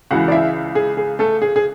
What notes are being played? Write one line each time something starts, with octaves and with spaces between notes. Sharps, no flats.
C#2 C#3 E3 F#4 F#5
D5
E4 E5
G#4
G#4
A3 A4
G#4
G#4